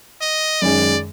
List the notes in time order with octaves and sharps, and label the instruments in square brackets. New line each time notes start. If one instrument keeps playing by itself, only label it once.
[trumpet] D#5
[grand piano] F#2 D#3 G#3 C#4 [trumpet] D5